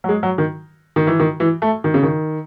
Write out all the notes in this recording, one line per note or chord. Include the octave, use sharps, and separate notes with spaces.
F#3
G#3
F#3
D#3
D#3
E3
D#3
E3
A3
D#3
C#3
D#3